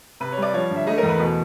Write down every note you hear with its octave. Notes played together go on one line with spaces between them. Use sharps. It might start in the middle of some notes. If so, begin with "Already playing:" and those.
C3 B4
G3 C#5
D5
F3 C#5
D3
E5
A3 D#5
A#4
E2
B4
B2